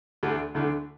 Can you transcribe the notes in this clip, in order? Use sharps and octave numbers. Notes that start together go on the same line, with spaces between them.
D2 D3 A3 D4
D2 D3 A3 D4